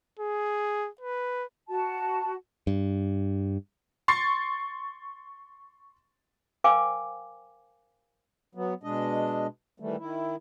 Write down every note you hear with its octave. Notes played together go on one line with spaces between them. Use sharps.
G#4
B4
F#4 A5
G2
C6 C#6 A6 C7
A#4 C5 F5 G5 G#5 D6
F#3 B3
B2 G#3 D4 D#5
D#3 E3 G3 A3
D#3 E4